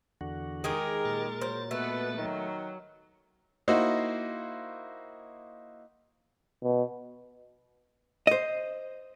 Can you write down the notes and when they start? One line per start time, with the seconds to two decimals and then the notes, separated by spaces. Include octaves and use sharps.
0.21 E2 D3 F#4
0.64 D#3 G#3 G4 G#4 A#4
1.05 A#2 A6
1.41 F#3 C5
1.71 B2 A3 B3 B4
2.18 D#3 F#3
3.68 A#3 D#4 E4 F#4 C5 D#5
6.63 B2
8.27 C5 D#5